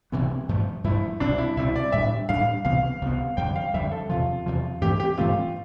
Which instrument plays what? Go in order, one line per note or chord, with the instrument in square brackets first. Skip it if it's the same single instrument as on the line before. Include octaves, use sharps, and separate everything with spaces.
[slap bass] C2 C3 E3 B3
G2 F3 A3
[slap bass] G2 F3 A3 [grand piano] E4
[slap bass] C2 B2 G3 C4 [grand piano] D4
[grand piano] E4
[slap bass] C2 B2 G3 C4 [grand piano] E4
[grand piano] D5
[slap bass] A2 G3 D4 [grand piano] E5
[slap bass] A2 G3 D4 [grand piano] F5
[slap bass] C2 C3 E3 B3 [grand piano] F5
[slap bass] C2 C3 E3 B3
[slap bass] F2 D3 G3 [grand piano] G5
[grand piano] F5
[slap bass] F2 D3 G3 [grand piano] E5
[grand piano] A4
[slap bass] E2 C3 F3 [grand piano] F4
[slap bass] E2 C3 F3
[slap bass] G2 E3 A3 C4 [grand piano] G4
[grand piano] G4
[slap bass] G2 E3 A3 C4 [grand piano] F4